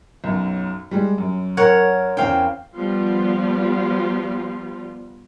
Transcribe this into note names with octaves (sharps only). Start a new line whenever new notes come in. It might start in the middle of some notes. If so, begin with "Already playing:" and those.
B1 F#2
G3 G#3
F#2
A#4 C#5 F#5
E2 C4 C#4 F5 G5
F3 G3 B3 F4